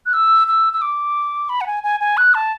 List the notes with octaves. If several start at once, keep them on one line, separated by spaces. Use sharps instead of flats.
F#6
E6
E6
E6
D6
B5
F#5
G#5
G#5
G#5
F#6
A5